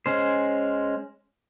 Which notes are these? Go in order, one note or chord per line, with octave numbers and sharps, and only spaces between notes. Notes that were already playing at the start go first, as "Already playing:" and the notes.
G#3 C#4 C5